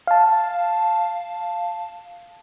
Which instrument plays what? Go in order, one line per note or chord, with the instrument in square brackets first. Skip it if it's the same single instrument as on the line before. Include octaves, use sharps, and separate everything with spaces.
[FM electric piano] F5 A5